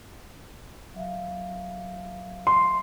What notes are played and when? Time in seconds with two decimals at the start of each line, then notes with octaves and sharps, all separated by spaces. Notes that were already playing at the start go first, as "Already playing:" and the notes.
0.94 F#3 E5 F5
2.47 C6